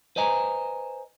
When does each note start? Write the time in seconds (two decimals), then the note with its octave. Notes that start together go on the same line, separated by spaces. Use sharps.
0.16 B4 C5 D#5 G#5 A#5